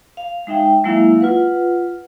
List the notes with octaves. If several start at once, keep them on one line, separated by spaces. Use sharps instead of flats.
F5
G#3 D#4 E5 G5
F#3 G#3 A#3 E4 E5 F5
F4 B4 F#5